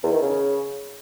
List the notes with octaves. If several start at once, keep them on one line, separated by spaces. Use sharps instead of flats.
E2
D#3
C#3